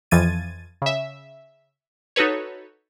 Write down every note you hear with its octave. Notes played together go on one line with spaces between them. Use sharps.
F2 E3 F3 G#6 A6 D#7
C#3 E5
D#4 F#4 A4 B4 C#5